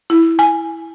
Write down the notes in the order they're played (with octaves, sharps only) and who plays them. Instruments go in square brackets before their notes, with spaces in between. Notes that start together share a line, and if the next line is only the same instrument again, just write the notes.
[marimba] E4
G#5